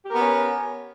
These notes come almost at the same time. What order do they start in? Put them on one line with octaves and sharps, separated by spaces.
G4 A#4 B3 C#4